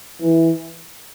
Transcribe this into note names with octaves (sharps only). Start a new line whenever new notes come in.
E3